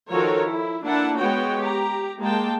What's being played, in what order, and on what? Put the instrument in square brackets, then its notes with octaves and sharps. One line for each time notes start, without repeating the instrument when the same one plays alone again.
[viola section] D#3 F3 F#4 A4 A#4 C#5
E4
A#3 D4 E4 F#5 A5
G#3 B3 F#4 C#5 G5
G4 A#5
G#3 A#3 G5 A5